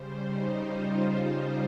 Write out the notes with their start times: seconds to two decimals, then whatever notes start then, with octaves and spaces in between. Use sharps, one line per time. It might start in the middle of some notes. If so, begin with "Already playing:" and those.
Already playing: C#3 G3 C5
0.24 D#4
0.62 F4
1.00 D#4